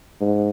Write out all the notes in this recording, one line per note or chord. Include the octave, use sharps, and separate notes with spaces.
G#2